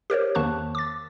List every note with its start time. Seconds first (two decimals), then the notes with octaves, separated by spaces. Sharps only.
0.10 G4 A#4 C5 C#5
0.35 E2 D#3 A#3 A5 C#6 F#6
0.75 D6 A6